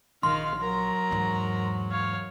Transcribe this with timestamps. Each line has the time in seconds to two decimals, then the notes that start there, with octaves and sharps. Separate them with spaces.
0.23 A#1 D#3 F5 C6
0.59 F#3 A#4 A#5
1.11 E2 G#2
1.90 C#5 F5